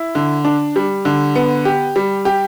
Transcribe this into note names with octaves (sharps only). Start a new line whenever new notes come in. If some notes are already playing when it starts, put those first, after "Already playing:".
Already playing: E4
D3
D4
G3
D3
B3
G4
G3
G4